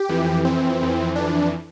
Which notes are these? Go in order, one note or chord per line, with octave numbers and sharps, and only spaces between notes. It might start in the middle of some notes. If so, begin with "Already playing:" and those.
Already playing: G4
F2 E3
C4
F2 E3
D4